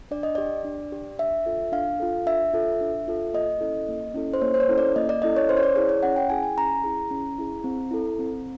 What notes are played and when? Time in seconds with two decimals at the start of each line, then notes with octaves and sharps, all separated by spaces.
0.11 D4 D5
0.23 D#5
0.35 G4 D5
0.65 D4
0.92 G4
1.19 D4 E5
1.46 F4 A4
1.72 D4 F5
2.00 F4 A4
2.26 D4 E5
2.53 F4 A4
2.81 D4
3.08 F4 A4
3.33 A#3 D#5
3.61 C#4 E4 A4
3.88 A#3
4.14 C#4 E4 A4
4.34 C5
4.41 A#3 C#5
4.54 C5
4.60 C#5
4.69 C#4 E4 A4
4.78 D5
4.96 A#3 D#5
5.09 D5
5.22 C#4 E4 A4 D#5
5.37 C#5
5.49 C#4 C5
5.57 C#5
5.63 D5
5.76 E4 G#4 D5
5.89 C#5
6.03 C#4 F#5
6.16 G5
6.30 E4 G#4 G#5
6.43 G#5
6.57 C#4 A#5
6.84 E4 G#4
7.10 C#4
7.38 E4 G#4
7.64 C4
7.91 E4 A4
8.19 C4